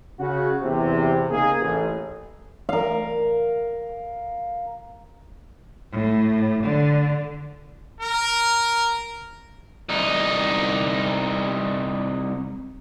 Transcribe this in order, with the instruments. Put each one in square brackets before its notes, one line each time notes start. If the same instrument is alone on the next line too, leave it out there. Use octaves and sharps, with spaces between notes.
[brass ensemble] C#3 F#4
E2 C3
C#3 A#3 D#4 G#4
A1
[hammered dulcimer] A#4 F5
[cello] A2
D3
[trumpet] A#4
[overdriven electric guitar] C2 D#4